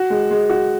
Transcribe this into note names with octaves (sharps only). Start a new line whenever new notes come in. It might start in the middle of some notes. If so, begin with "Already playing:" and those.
Already playing: F#4
G#3
G#3
F#4